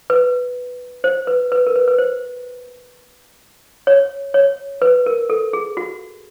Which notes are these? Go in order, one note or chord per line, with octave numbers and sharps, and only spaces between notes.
B4
C5
B4
B4
A#4
B4
B4
C5
C#5
C#5
B4
A#4
A4
G#4
F#4